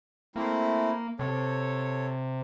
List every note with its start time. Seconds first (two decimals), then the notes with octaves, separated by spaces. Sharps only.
0.36 A3 A#3 C4 E4
1.19 C3 A4 C#5